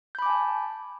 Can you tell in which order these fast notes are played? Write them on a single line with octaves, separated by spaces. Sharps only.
G6 B5 D6 G#5 A5